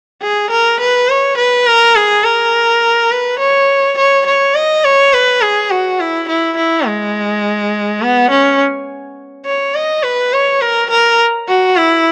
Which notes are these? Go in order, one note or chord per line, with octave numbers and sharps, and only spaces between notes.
G#4
A#4
B4
C#5
B4
A#4
G#4
A#4
B4
C#5
C#5
C#5
D#5
C#5
B4
G#4
F#4
E4
E4
E4
G#3
B3
C#4
C#5
D#5
B4
C#5
A#4
A#4
F#4
E4